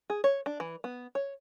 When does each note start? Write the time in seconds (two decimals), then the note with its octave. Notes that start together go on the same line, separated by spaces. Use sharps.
0.10 G#4
0.24 C#5
0.46 D4
0.60 E3
0.84 B3
1.15 C#5